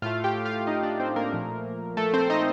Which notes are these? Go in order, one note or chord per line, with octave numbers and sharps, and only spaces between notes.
A2 A3 F4 F5
G4 G5
F4 F5
D#4 D#5
D4 D5
C4 C5
A#3 A#4
A#2 F3 A3
A3 A4
C4 C5
D#4 D#5